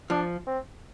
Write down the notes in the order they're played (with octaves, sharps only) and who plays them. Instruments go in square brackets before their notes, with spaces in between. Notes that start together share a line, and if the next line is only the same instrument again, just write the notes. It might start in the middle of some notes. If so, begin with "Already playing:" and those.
[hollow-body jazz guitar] F3 [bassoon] D4
[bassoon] C4